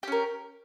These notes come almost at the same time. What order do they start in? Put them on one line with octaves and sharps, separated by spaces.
G4 C#4 A#4